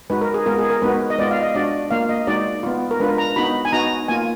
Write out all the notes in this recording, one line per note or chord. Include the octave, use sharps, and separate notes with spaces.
G#3 D#4 F#4 B4
A#4
G#4
G#3 B3 F4 A#4
G#4
A#4
G#3 B3 D#4 F#4 B4
D#5
G#3 B3 F4 D5
F5
D#5
G#3 D4 F#4 D5
A#3 F4 F5
D#5
G#3 D#4 F#4 D5
B3 F4
A#4
G#3 D4 F4 B4
A#5
B3 D#4 F#4 B5
G#5
B3 D#4 F#4 A#5
A#3 F4 G#5